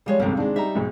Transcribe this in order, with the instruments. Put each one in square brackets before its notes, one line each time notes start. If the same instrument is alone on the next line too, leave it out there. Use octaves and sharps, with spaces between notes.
[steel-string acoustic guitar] F3 G#3 C#5 [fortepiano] G3
[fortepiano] C2 F2 G#2 [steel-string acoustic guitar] D3 A#3
[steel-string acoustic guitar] D#3 [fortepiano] G#3 C4 D4
[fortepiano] G3 D#4 A#5 [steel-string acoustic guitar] E5
[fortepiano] B1 G#2 G#3